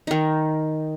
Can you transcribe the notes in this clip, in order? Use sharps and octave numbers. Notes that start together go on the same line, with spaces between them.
D#3 D#4